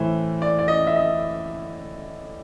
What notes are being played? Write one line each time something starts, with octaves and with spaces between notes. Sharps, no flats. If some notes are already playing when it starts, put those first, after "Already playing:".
Already playing: A2 E3 C5
D5
D5
D#5
E5
D#5